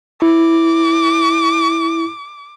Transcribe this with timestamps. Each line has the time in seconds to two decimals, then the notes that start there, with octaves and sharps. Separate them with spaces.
0.22 E4 D6